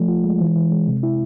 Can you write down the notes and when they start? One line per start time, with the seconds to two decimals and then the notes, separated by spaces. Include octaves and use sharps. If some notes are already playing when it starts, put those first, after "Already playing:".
Already playing: F3 A3
0.08 F4
0.24 G#3
0.41 E3
0.56 E3
0.71 G#3
0.87 C3
1.03 E4